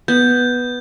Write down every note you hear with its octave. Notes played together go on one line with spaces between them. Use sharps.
B3 G6